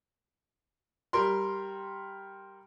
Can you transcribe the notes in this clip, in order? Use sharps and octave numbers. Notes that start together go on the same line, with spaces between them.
G3 A#4 C6